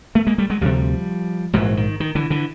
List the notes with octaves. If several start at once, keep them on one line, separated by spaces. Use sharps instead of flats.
A3 B3
G#3 A#3
G3 A3
F#3 G#3
D2 C3 F3 G3
A#1 G#2 E3 F#3
D#3
D#3
D3 E3
D3 E3